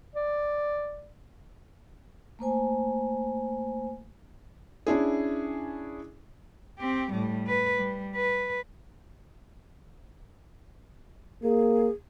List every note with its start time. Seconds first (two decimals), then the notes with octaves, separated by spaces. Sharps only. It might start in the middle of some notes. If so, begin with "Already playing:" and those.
0.16 D5
2.39 A3 A#3 C5 G#5
4.87 C#4 D4 E4 G#4
6.79 C4 G4
7.12 A2 G3
7.47 B4
7.76 G3
8.15 B4
11.44 A#3 G#4